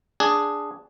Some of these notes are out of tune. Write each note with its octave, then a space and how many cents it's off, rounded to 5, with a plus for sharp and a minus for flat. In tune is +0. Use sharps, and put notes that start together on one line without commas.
D4 +0 G#4 +0